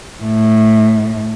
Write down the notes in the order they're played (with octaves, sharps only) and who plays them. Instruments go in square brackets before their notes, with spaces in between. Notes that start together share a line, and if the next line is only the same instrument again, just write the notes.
[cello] A2